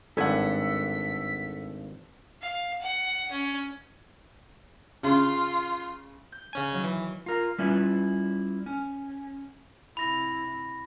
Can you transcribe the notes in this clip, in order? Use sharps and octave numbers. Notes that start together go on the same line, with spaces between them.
G#1 G2 A4 F#5 G#5 B6
F5
F#5
C#4
C#3 F4
G6
C#3 C#4 G#5
D#3 F#3
E3
F4 A#4
G3 C#4 E4 F4 B4
C#4
C3 E4 B5 A#6